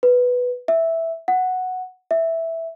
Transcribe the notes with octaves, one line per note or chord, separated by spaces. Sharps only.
B4
E5
F#5
E5